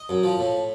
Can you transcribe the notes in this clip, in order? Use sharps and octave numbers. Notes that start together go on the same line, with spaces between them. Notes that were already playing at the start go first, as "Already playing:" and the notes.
Already playing: D#5
F#2
F3
A2